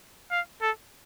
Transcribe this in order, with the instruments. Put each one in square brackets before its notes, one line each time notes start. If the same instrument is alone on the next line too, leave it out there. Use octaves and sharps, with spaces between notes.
[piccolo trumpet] F5
A4